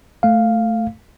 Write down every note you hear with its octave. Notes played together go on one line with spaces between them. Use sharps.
A3 F5